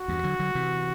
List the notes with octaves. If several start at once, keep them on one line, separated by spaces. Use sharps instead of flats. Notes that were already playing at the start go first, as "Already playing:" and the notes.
Already playing: F#4
E2 G2
D3 F#3
D3 F#3
C3 E3